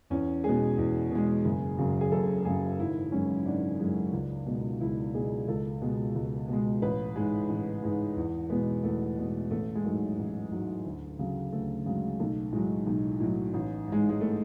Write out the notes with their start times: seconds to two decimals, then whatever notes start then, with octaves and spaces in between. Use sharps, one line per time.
0.10 E2 C#4
0.44 B2 G#3 G#4
0.78 E2
1.11 B2 G#3
1.45 F#1
1.78 F#2 C#3 F#3
2.01 G#4
2.11 F#1 A4
2.45 F#2 C#3 F#3 G#4
2.79 G#1 E4
3.12 F#2 E3 G#3 C#4
3.46 G#1 D4
3.79 F#2 E3 G#3
4.13 C#2
4.46 B2 G#3
4.80 C#2 E4
5.14 B2 G#3 G#4
5.48 C#2 A4
5.82 B2 G#3
6.15 C#2
6.48 B2 G#3
6.82 A1 B4
7.16 G#2 G#3
7.49 A1
7.83 G#2 G#3
8.17 E2
8.50 B2 G#3 B3
8.83 E2 A3
9.18 B2 G#3
9.50 A1 A3
9.75 G#3
9.84 G#2 F#3 A3
10.18 A1
10.51 G#2 F#3
10.85 D2
11.19 C#3 F#3
11.52 D2 A3
11.86 C#3 F#3 G#3
12.19 B1 A3
12.53 A2 F#3 G#3
12.87 B1
13.20 A2 F#3
13.54 A1
13.88 G#2 G#3
14.09 G#3
14.21 A3